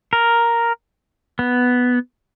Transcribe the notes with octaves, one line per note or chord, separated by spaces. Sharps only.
A#4
B3